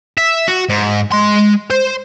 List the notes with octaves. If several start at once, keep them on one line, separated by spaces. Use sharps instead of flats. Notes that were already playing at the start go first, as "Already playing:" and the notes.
E5
F#4
G#2
G#3 C6
C5